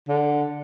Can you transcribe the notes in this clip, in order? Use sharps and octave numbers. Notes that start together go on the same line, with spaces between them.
D3